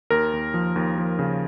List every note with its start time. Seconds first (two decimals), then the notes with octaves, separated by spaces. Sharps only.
0.10 D#2 A#4
0.33 D#2
0.54 F3
0.76 D#2
0.98 F3
1.19 C#3